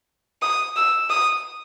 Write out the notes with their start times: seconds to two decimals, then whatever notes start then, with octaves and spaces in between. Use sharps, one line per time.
0.42 D#6
0.76 E6
1.10 D#6